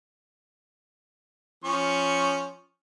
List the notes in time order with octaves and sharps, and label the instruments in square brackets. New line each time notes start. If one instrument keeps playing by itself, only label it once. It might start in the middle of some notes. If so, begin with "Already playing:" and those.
[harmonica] F3 C#4 C#6